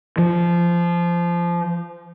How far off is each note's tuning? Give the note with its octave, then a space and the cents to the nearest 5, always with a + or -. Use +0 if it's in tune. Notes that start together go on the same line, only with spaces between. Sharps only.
F3 -15